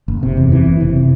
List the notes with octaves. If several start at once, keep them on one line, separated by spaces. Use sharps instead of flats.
F#1
C3
E2
E3
F#1
C3